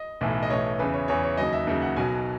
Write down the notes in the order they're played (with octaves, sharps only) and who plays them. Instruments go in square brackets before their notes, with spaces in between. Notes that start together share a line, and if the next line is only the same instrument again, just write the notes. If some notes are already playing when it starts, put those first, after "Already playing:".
Already playing: [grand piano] D#5
B1 A2 E3
D#5
B1 A2 E3 C#5
E2 C#3 E3 B4
C#5
E2 C#3 E3 C#5
C#5
D#2 C#3 F#3 D#5
E5
D#2 C#3 F#3 E5
F#5
B1 B2 F#3 G#5